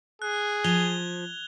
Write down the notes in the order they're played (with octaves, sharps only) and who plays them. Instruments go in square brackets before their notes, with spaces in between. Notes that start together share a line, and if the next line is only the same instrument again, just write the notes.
[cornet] G#4 [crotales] F#6
[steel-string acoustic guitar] F3 [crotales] G#6 F7 G7